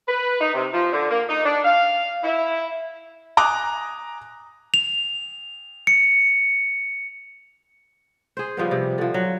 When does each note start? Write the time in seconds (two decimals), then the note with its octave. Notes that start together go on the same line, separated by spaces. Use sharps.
0.08 B4
0.40 D#4
0.54 C3
0.72 F3
0.92 D3
1.10 A#3
1.29 D#4
1.44 D4
1.64 F5
2.24 E4
3.37 G#5 A#5 D6 D#6 F#6
4.74 F7
5.87 C#7
8.37 G#4 C5
8.57 C#3 F3 G3 B3
8.71 C3
8.98 D3 F3
9.14 F#3